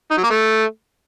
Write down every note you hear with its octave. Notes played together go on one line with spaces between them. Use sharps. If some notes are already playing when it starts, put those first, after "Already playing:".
D#4
F#3
A#3
A3